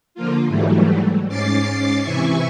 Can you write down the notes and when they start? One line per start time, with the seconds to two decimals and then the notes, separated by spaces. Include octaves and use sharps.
0.15 D3 F3 A#3 F4
0.48 G#2 E3 F#3 G3 A3
1.28 G#2 C#4 D6 A6 C7
2.02 C3 E3 E4 E5 G#5 C#6